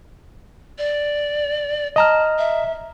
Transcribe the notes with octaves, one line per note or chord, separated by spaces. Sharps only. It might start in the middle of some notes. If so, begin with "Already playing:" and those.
D5
D#5 A5 A#5 F6
E5